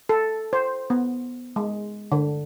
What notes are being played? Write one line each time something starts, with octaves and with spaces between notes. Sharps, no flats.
A4
C5
B3
G#3
D3